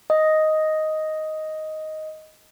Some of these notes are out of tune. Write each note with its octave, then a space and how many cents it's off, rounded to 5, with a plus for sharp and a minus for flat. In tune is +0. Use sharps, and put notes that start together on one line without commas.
D#5 +5